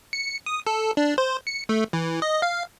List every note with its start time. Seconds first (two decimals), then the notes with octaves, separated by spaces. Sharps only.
0.13 C#7
0.46 D#6
0.67 A4
0.97 D4
1.18 C5
1.47 C#7
1.69 A3
1.93 E3
2.22 D#5
2.42 F5